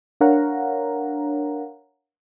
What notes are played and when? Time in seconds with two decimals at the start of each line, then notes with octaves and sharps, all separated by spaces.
0.21 D4 A#4 C#5 F5 F#5 A#5